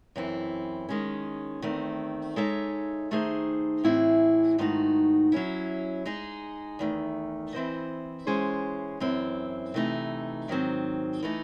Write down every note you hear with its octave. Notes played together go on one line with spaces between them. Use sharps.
F#2 E3 C4 E4
D#3 G#3 C#4
E2 D#3 A3 C4
G#3 D#4 A4 C#5 E5
D#3 A3 D#4 G#4 C5
A2 E3 C4 E4 G#4
G#2 D#3 A3 D#4 F#4
F#3 C#4 E4
G#3 D#4 G#4
E2 D#3 A3
E3 C4 E4 C5 D#5
E3 G#3 C#4 G#4 C5
F#2 E3 C4 E4
C3 E3 A3 D#4
G#2 D#3 F#3 C4
E3 A3 D#4 A4